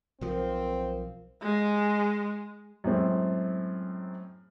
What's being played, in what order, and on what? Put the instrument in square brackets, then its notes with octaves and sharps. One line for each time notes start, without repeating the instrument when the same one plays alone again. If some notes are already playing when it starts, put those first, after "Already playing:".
[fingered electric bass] B1 F3 [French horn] C4 [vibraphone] A#4 F5
[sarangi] G#3
[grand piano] F#2 A2 G#3 C4